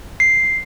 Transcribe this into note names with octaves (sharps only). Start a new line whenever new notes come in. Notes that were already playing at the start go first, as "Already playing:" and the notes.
C7